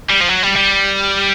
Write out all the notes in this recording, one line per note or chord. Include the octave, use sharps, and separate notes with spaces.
G3
F3
F#3
G3
G3